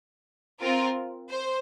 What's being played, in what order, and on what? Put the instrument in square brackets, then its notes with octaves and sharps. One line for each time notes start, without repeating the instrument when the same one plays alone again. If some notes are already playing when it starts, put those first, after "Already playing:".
[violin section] C4 F4 A#4
C5